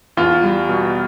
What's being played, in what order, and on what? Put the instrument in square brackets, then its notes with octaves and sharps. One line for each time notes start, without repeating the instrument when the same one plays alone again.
[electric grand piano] E2 [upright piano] F4
[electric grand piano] G3
B2